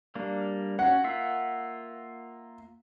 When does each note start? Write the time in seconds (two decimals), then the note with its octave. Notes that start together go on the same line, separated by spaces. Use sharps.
0.15 G3 A#3 D4
0.79 C#4 F#4 F#5
1.04 A#3 F4 E5